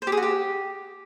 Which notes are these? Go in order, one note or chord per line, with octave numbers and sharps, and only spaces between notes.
C5
G4
G#4
F#4
G4